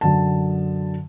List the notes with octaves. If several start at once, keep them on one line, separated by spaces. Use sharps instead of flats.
F#2 D3 A5